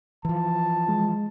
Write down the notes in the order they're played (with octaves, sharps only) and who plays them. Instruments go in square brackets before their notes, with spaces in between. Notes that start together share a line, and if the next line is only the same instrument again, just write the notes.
[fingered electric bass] E3 F3 [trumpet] A5
[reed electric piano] G#3